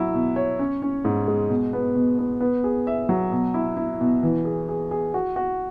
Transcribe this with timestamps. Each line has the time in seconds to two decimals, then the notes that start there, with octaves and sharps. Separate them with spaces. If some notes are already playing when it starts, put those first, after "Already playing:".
Already playing: F#3 E4
0.14 B2
0.36 C#5
0.59 C#4
0.82 C#4
1.05 G#2
1.28 G#3
1.50 B2
1.73 B3
1.95 B2
2.19 B3
2.41 B3
2.64 G#4
2.87 E5
3.09 F#3
3.32 B2
3.54 E4
3.77 E4
4.01 B2
4.23 E3
4.45 G#4
4.69 G#4
4.91 G#4
5.14 F#4
5.36 F#4